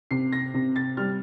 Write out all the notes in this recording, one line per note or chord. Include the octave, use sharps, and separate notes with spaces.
C3 C7
A#6
C3
A6
G3 F6